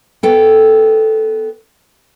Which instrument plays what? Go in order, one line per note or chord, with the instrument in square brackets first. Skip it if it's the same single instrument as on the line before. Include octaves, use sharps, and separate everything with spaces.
[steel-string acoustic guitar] B3 A4 G5